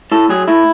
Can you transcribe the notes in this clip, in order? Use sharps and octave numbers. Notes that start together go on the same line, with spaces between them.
A2 A4
F#3 G#4
A2 E4